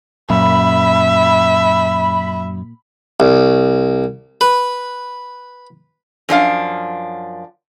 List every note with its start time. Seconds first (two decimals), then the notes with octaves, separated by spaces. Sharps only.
0.30 F#2 A#2 E5 B5
3.20 C2
4.41 B4
6.29 F#2 F3 D4 F5